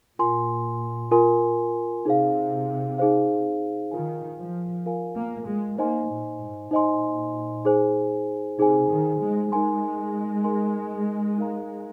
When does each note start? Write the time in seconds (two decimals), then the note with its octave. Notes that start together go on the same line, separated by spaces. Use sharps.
0.18 A#2 F4 A#4 G#5 C6
1.11 F4 A#4 G#5 C6
2.05 C3 D#4 G#4 C5 F5
2.98 D#4 G#4 C5 F5
3.91 D#3 F4 A#4 F5 G#5
4.38 F3
4.86 F4 A#4 F5 G#5
5.16 A#3
5.47 G#3
5.78 A#3 D#4 C5 D#5 G#5 C6
6.09 A#2
6.41 G#2
6.71 A#2 D#4 C5 D#5 G#5 C6
7.65 D#4 G#4 C5 G#5
8.58 C3 D#4 G#4 C5 G#5
8.89 D#3
9.20 G#3
9.51 G#3 D#4 A#4 G#5 C6
10.44 D#4 A#4 G#5 C6
11.38 D#4 A#4 F5 A#5